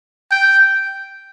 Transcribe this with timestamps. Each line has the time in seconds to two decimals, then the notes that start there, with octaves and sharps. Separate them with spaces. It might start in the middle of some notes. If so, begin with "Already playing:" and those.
0.31 G5